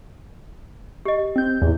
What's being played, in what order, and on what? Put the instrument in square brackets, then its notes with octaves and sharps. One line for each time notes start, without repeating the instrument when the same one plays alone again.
[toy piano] G4 D#5
[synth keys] C4 G6
E2 A2